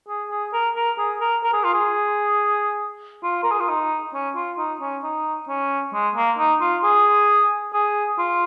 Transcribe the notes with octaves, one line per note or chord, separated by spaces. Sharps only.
G#4
G#4
A#4
A#4
G#4
A#4
A#4
G#4
F4
G#4
F4
A#4
G#4
F4
D#4
C#4
F4
D#4
C#4
D#4
C#4
G#3
A#3
D#4
F4
G#4
G#4
F4